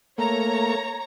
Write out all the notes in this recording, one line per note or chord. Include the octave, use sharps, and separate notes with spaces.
A3 A#3 C#5 A#5